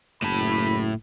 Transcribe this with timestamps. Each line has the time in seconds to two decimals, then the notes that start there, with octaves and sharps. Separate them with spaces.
0.22 F#1 A2 A5 B5